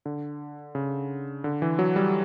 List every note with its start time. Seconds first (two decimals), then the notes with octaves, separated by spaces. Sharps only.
0.06 D3
0.75 C#3
1.44 D3
1.62 E3
1.79 F#3
1.96 G3